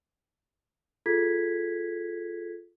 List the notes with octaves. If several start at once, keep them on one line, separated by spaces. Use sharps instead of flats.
F4 G#4 A4 G#6 B6